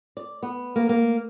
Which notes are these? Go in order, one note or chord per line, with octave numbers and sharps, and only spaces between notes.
D5
B3
A#3
A#3